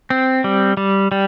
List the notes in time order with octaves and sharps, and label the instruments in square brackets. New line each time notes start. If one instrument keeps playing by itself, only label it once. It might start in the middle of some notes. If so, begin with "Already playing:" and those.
[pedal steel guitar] C4
G3
G3
G3